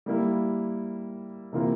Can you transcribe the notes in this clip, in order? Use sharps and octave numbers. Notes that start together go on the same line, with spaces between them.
G3 A#3 E4
C3 E3 A#3 F4 A#4